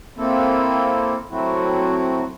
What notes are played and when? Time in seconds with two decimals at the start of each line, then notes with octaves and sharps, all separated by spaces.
0.17 A#3 C4 E4 A4
1.30 F#3 A3 C4 E4 F#4